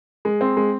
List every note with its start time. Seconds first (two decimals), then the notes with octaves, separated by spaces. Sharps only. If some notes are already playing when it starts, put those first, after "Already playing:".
0.25 G#3
0.41 C4
0.57 G#3